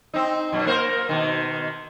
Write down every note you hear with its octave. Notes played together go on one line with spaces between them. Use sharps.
C4 D#4
F#2 B2
A#3 A#4 C5
B2 D#3